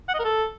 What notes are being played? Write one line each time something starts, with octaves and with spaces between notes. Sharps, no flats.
F#5
D#5
A#4
A4